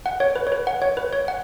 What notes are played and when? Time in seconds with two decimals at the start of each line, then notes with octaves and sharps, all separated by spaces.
0.06 F#5
0.20 C#5
0.36 B4
0.47 C#5
0.52 B4
0.67 F#5
0.82 C#5
0.97 B4
1.13 C#5
1.28 F#5